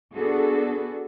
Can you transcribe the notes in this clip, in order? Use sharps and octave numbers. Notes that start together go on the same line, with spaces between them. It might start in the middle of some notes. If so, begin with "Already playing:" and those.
B3 D4 F#4 G#4 A4